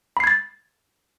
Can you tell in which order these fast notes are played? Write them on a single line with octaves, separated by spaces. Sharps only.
B5 C7 G#6 A6